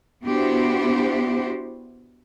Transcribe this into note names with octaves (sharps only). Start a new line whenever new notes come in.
B3 D4 E4 F#4 G4 C5